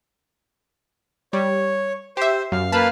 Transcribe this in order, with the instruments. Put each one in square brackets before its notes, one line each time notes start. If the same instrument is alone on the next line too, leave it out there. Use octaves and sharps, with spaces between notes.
[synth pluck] G3 [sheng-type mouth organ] C#5
[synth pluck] G4 E5 [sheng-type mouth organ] C5
[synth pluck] F#2 [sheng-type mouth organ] F5
[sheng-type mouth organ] A#3 B4 F5 [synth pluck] A5 B5